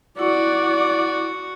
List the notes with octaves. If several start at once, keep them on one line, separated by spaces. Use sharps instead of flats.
E4 F#4 D5 F#5